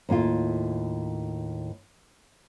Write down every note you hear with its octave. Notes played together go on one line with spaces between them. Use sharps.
D#2 A2 E4 F4